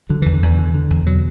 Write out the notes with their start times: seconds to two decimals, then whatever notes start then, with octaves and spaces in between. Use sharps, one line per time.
0.09 D3 F#3
0.22 E2 E3
0.33 D3
0.42 E2 E3
0.59 D3
0.74 D3
0.90 E2
1.06 B2 F#3